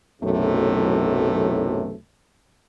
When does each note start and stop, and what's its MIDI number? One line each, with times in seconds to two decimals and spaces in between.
0.22 1.95 35
0.22 1.95 42
0.22 1.95 45
0.22 1.95 48
0.22 1.95 52
0.22 1.95 57